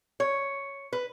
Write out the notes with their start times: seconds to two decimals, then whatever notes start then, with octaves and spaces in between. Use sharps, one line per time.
0.20 C#5
0.93 B4